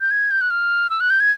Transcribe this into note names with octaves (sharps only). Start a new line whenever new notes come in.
G6
G#6
G6
F#6
F6
E6
F#6
G6
G#6